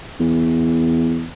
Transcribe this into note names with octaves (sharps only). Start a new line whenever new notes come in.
E2